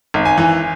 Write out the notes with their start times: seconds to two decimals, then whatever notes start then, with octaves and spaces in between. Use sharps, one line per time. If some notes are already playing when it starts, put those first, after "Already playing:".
0.14 G#1
0.25 G#5
0.38 E3